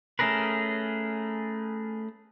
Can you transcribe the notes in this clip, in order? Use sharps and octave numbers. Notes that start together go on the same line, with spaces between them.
A3 C#4 G#4 A#4 B4